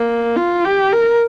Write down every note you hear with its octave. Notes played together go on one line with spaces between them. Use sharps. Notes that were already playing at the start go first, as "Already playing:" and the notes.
Already playing: A#3
F4
G4
A#4